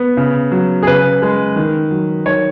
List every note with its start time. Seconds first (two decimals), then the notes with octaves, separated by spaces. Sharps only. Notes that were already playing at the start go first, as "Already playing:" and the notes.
Already playing: B3
0.17 C#3
0.51 F#3
0.83 G#4
0.87 C#3 B4
1.22 G#3
1.56 D#3
1.91 F#3
2.26 D#3 C#5